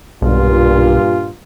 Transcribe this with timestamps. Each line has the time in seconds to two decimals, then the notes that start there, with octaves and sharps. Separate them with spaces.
0.22 B1 G2 A#2 F4